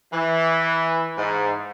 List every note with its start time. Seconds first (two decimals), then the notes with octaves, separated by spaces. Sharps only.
0.13 E3
1.18 G#2